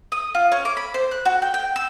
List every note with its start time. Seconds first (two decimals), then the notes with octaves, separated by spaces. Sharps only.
0.12 D#6
0.35 F4
0.52 C#4
0.65 D6
0.77 B5
0.94 C5
1.11 F#6
1.25 F#4
1.42 G5
1.54 G5
1.76 E6